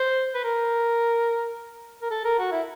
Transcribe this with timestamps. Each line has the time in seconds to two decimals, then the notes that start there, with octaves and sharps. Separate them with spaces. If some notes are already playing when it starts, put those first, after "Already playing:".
Already playing: C5
0.34 B4
0.44 A#4
2.02 A#4
2.11 A4
2.25 A#4
2.39 F#4
2.52 E4